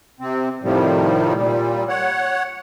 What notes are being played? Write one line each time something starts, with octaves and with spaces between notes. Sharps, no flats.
C3 C4
A2 C3 D#3 F3 G3
A#2 G3
C#5 F#5